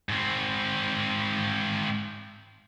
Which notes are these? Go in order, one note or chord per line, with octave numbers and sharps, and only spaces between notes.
G#2 C4